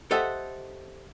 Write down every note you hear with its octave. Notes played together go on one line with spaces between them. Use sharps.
G4 A4 C5 D#5 E5 F#5